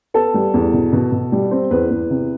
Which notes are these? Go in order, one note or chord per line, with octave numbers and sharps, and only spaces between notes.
B3 A4
G3
E2
B2
B2
B2
G3
C4
E2 B4
E2
C3